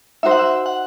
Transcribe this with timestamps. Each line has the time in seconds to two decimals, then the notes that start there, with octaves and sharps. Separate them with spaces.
0.23 D#4 F#4 C5 E5
0.31 F#5
0.39 E5
0.66 F#5